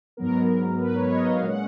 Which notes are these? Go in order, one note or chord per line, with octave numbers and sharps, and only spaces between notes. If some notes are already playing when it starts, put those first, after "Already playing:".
G#2 F#3 B3 A#4
B4
C#5
D#5
F5
A#2 G#3 C#4 F#5